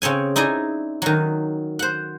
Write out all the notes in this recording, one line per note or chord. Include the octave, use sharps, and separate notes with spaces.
C#3 C4 C#5 G#5
D#4 E4 G#4 D5 D#5
D#3 F#3
C5 F#5